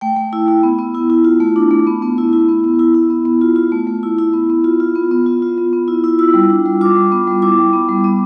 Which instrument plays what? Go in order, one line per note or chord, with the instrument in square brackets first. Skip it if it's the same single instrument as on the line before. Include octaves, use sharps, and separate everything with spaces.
[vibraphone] A3 G5
A3
E4
E4
B3
B3
E4
E4
F4
A3
D4
A3
B3
B3
E4
E4
B3
B3
E4
E4
B3
B3
F4
F4
A3
A3
E4
E4
B3
B3
F4
F4
B3
B3
F4
F4
B3
B3
E4
E4
F4 E6
G3
D4
G3
F4 D6
G3
B3
G3
E4 D6
G3
B3
G3
B3